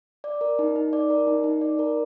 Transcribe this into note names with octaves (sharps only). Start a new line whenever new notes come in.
D5
A#4
D#4
D#4
D5
A#4
D#4
D#4
D5
A#4